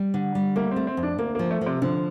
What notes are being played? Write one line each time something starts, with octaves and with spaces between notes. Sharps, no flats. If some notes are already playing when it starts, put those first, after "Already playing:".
Already playing: G3
D3
G3
A3 A#3
C4
A3
C4
F2
D4
D2 A#3
F3 A#3
A3
F3
C3
D3 F3